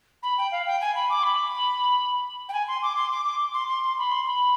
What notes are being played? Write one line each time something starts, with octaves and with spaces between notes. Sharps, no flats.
B5
G5
F5
G5
G#5
B5
D6
B5
G5
G#5
C6
D6
C6
D6
D6
C6
C6
C6
B5
C6
B5